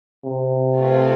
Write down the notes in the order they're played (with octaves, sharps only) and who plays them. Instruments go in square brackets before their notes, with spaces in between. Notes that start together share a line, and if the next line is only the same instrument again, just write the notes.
[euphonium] C3
[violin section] A3 C4 F4 G#4 B4